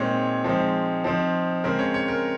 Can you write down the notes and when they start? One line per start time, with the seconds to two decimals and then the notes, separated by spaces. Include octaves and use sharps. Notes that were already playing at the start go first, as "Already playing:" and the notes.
Already playing: A#2 G#3 C4 D#4 C#5
0.44 F3 G#3 C4 D#4
1.04 F3 C4 D#4
1.64 C#3 G#3 C4 A#4
1.79 C#5
1.94 C#5
2.08 A#4